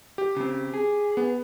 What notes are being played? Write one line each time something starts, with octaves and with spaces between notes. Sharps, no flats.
G4
C#3 C4
G#4
B3